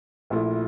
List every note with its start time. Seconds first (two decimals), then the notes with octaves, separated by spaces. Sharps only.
0.30 A#1 A#2 A3 E4